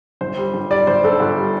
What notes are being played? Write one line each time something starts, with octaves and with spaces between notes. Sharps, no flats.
G1 C5
G3
G1
G3 D5
G1 C5
G1 A4
G1
G3